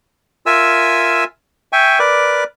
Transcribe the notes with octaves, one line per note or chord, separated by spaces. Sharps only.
F4 A#4 E5 G#5 E6
E5 G5 G#5 C#6
A#4 B4 D5 D6